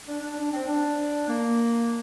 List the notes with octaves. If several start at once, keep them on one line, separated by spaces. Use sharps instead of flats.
D4
D4
D4
C4
D4
A#3